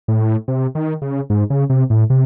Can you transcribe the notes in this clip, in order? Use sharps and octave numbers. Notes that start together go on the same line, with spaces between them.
A2
C3
D#3
C#3
G#2
C#3
C3
A2
C3